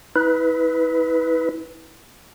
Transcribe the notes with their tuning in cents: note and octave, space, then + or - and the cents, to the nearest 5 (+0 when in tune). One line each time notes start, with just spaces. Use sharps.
E4 -35 B4 +0